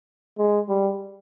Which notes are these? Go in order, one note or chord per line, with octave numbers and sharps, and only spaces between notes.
G#3
G3